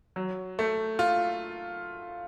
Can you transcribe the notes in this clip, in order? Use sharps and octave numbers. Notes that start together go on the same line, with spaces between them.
F#3
A3
F4